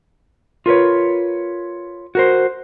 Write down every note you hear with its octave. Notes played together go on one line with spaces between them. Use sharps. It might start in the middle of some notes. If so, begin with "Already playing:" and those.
F4 A#4 B4 C#5
F#4 A#4 C5